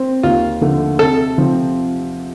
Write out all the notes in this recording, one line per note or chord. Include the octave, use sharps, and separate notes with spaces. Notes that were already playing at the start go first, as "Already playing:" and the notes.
Already playing: C4 C5
D#2 F4
D3 F3 A3
C3 A4
F3 C4